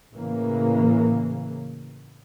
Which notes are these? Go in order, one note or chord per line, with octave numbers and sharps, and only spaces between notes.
A2 C#3 E3 A#3